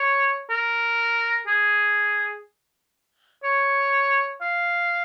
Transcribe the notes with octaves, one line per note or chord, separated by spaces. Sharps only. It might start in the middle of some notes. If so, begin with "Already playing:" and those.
Already playing: C#5
A#4
G#4
C#5
F5